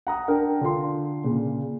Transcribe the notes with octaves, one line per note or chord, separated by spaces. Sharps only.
F#5 A#5 D#6
D4 A#4 G5
D3 F4 C6
A#2 C#3